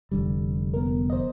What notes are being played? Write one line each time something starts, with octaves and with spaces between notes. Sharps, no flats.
F1 D3 G3
B3 A#4
C5 D5 D#5